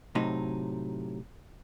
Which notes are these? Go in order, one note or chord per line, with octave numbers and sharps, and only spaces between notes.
A2 C3 F#3 D#4